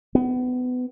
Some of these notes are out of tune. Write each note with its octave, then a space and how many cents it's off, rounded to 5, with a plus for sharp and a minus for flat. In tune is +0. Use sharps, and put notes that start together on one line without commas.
B3 +25